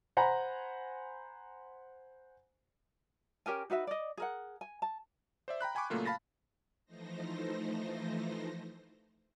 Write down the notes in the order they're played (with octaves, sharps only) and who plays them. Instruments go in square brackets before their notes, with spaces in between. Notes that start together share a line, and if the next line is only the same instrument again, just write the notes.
[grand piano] C5 F#5 G#5 A#5 B5
[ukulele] C#4 G4 A#4 G#5
D#4 F#4 B4 E5
D5 D#5
G#4 A#4 F#5
G#5
A5
[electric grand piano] C5 D5 E5
G5 A#5 B5 F#6
G5 G#5 B5 C#6 D6
A#2 C#3 F#3 A3 A#3 F4
F5 A5 B5 A6 A#6
[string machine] E3 F3 A3 D#4 C5 A#6